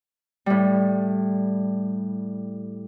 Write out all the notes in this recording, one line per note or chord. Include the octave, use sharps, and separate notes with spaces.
A2 G3